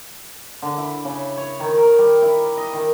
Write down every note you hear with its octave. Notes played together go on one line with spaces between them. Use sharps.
D3
E4
C#3
C#5
D#3
A#4
G3
E4
D#5
D#3